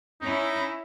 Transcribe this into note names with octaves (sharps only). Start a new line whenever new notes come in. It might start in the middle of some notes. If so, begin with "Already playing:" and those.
C#4 D#4 E4